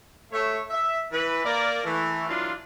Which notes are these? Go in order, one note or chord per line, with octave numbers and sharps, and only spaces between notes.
A3 C#5 E5
E5
E3 B4
A#3 A#4 D5
E3 A3
E3 F#3 D4 F4